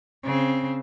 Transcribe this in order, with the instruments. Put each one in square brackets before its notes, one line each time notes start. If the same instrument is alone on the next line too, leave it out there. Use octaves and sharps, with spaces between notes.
[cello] C#3 C4